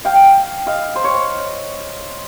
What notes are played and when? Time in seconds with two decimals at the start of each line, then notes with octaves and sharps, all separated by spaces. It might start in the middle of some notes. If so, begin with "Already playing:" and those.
0.05 F5 G5
0.67 D#5 F5
0.96 C5
1.04 C#5